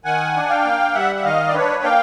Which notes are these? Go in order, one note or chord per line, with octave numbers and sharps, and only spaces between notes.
D#3 F#5 G#5
D4
F5 G5
A#3
G3 E5 F#5
E5
D#3 D#5 F5
D5
D4 B4 C#5
A#3 F5 G5